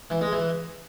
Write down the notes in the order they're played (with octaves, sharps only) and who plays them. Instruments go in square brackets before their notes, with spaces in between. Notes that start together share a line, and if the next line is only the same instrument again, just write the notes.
[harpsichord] E3
G#3
E3